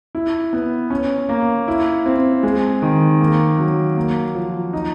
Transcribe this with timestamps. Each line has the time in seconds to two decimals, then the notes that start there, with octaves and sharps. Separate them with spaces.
0.15 E4
0.53 B3
0.90 C#4
1.29 A#3
1.68 E4
2.06 C4
2.43 G#3
2.82 D#3
3.20 A#3
3.59 F#3
3.97 A#3
4.35 F3
4.73 D#4